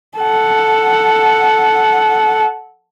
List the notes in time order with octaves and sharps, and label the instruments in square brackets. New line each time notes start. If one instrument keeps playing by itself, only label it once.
[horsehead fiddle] A4 F#5